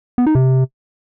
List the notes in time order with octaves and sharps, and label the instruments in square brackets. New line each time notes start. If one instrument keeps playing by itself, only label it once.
[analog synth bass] B3
D#4
C3